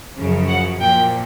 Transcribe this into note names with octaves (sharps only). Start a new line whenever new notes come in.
F#2 C#3 F3
F#5
A#2 F3 G5